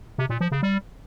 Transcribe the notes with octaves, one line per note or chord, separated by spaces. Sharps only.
C3
A#2
F3
C#3
G3